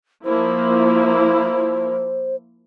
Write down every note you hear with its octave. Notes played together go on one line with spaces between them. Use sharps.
F3 A#3 E4 C5